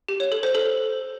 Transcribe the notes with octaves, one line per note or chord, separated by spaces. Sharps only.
G4
C#5
A4
C5
A4